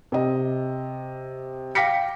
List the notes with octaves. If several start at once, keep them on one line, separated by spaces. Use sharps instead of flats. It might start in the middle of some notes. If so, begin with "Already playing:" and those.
C3 D#5
F5 G5 D6 A#6 B6 C#7